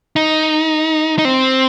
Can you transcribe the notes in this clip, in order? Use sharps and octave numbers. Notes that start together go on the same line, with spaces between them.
D#4
D#4
C4